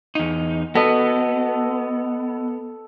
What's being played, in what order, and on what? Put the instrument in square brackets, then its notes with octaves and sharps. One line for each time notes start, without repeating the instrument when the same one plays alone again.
[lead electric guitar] E2 D#4
[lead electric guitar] B3 [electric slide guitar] F#4 D#5 [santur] A4